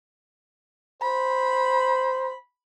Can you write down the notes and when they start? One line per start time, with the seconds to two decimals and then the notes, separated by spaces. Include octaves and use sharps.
1.02 C5 B5